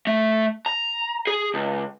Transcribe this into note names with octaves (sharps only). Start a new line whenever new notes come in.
A3
A#5
G#4
C#2